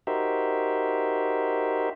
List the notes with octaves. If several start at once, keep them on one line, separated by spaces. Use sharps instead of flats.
D#4 F#4 G4 A#4 C5 E5